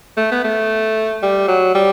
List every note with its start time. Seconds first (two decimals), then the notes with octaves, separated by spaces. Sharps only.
0.17 A3
0.31 B3
0.44 A3
1.22 G3
1.48 F#3
1.75 G3